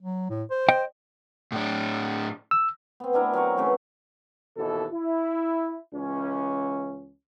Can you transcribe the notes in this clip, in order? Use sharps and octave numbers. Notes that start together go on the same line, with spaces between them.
F#3
A2
C5
D#5 G5
A2 D4
E6
B3 C4
B3 D4 E4 A#4
F#3 C4 A#4 C#6
C#3 E3 A3 C4
D#2 B2 E3 A4
E4
C#2 E3 C#4